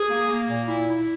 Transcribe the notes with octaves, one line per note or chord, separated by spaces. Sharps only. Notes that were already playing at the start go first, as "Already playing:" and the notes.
Already playing: G#4
A#3
A#3
A#2
E4
E4